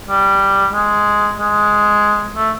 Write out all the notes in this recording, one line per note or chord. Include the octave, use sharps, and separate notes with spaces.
G3
G#3
G#3
A3